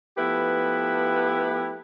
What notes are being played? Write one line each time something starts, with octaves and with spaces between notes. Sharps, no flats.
F3 A3 B3 E4 G4 B4